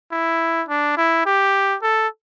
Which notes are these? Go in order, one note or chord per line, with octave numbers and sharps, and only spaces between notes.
E4
D4
E4
G4
A4